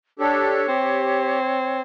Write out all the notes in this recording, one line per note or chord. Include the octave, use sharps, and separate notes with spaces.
D4 G4 A4 C#5
C4 G4